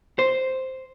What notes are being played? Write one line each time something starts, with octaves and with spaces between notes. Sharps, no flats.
C5